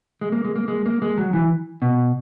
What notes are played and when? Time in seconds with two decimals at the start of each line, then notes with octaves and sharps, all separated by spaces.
0.21 G#3
0.32 A#3
0.45 G#3
0.56 A#3
0.68 G#3
0.86 A#3
1.02 G#3
1.18 F#3
1.33 E3
1.82 B2